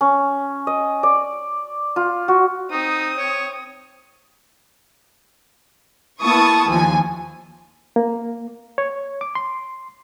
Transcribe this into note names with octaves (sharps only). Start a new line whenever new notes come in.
C#4
D#5
D5
F4
F#4
C4 D#4 D#6
C#5
A#3 B3 E4 A5 C#6 D#6
D#2 F3 G#5
A#3
C#5
D6
C6